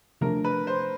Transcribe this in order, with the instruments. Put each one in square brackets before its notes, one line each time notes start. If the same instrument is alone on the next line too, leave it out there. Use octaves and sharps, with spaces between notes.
[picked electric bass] C3 F3 A3 D4 [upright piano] A#4
[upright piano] B4
C5